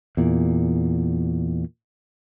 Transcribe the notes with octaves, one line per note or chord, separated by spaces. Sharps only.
E2 A#2